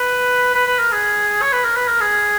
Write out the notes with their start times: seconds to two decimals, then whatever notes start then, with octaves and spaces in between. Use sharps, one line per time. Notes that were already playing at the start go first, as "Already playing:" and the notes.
Already playing: B4
0.55 B4
0.68 B4
0.79 A#4
0.92 G#4
1.42 C#5
1.53 B4
1.65 A#4
1.76 B4
1.88 A#4
2.01 G#4